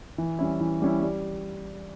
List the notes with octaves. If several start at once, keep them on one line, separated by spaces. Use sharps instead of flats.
E3
G3 C#4 E4
E3
G3 C#4 E4
G3